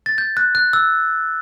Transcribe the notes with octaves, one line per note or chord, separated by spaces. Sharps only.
A6
G6
F#6
F#6
E6